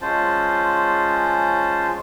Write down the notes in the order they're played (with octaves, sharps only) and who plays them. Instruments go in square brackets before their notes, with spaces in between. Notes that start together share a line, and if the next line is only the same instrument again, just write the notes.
[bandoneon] G#3 C#4 F4 C5 A5